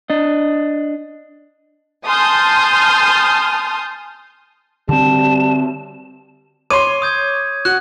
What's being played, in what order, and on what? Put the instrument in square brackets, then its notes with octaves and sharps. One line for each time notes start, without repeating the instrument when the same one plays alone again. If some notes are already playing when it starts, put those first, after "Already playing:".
[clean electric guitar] D4 D#5
[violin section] G#5 A5 C6 D#6 F6 G6
[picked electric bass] D3 C4 [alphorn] G3 [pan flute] A5
[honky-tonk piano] C#5 [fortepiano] C6 D6 [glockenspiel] D#7
[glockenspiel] D#6 G6 G#6
[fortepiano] F#4 [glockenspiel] F#6